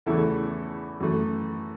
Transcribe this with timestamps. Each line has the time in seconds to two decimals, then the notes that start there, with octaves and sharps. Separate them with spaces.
0.06 E2 C#3 E3 A3 E4 A4
1.00 F#2 E3 A3